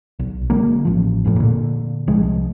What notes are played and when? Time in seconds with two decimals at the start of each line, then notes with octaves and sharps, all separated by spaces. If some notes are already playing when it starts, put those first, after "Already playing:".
0.19 B1
0.50 D3 F#3 G#3 A#3
0.85 A1 F3
1.25 F#1 F2 A2
1.36 A#2 D3
2.08 C2 F3 G#3